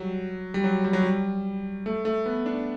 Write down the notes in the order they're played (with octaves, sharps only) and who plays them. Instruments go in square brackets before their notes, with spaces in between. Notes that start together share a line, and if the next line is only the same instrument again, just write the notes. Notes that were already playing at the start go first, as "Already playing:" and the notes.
Already playing: [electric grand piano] F#3 G3
G3
F#3
G3
F#3
G3
A3
A3
B3
D4